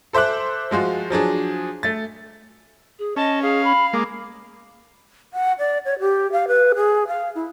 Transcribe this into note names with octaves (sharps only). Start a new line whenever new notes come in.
A4 C5 E5 D6 F#6
F3 G#3 F4 F#4
F3 F#3 D4 G#4
A3 A6
G#4
C#4 D#5 A5
G#4 F5
B5
G#3 A#3 D6
F#5
D5
C#5
G4
F5
B4
G#4
F5
E4